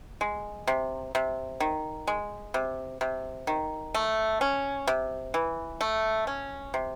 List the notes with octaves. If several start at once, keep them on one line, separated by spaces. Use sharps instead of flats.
G#3
C3
C3
D#3
G#3
C3
C3
D#3
A3
C#4
C3
E3
A3
C#4
C3